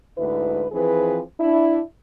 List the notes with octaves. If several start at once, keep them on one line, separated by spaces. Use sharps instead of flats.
D2 G#2 E4 B4
E3 F3 C4 G#4 B4
D4 E4